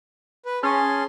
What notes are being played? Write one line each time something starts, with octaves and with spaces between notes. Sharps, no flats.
B4
C#4 G#4 A5 C6